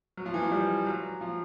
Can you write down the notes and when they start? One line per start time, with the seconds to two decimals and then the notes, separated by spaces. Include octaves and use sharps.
0.17 F#3
0.26 F3
0.34 E3
0.43 F3
0.52 G3
0.86 F#3
1.21 F3